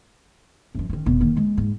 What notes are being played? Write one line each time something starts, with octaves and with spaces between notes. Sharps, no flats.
F#2 F3
D#3 C#4
F1 B2
D#3 A#3
G#3
G#2